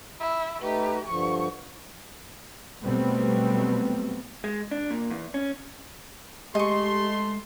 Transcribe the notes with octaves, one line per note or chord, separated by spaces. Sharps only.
E4
A3 D#4 G4 B4
G2 D3 F3 C#6
B2 F#3 G3 A3 B3 C4
G#3
D4
A#2
E2
C#4
G#3 A3 G4 D#5 C6 C#6